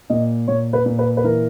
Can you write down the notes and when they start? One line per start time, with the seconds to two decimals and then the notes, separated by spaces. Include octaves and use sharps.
0.10 A#2 D#5
0.48 A#2 C#5
0.73 B4
0.86 A#2
0.99 B4
1.17 B4
1.24 E3 A#4